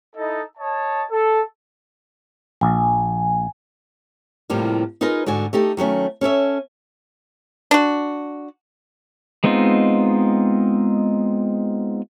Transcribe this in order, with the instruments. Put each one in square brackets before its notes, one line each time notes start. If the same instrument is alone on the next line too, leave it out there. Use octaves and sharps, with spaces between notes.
[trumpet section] D#4 E4 A4 D#5
C#5 D#5 A5
A4
[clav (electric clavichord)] A#1 [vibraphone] G#5
[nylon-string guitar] A2 C3 F3 G3 A#3
D#4 F4 G#4 A#4 B4 D#5
G#2 D3 F#4 G#5
A3 D#4 G4 A4
D#3 F#3 A3 C#4
C#4 A4 C#5 E5
[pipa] D4 F#4
[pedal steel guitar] G#3 B3 C4 D#4 F4